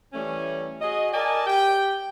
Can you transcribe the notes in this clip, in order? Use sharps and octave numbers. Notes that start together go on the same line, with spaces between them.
E3 G3 A3 C#4
F#4 G#4 D#5
A#4 D5 D#5 G#5 A5
G4 G5